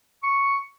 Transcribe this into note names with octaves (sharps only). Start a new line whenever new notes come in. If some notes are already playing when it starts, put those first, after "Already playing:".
C#6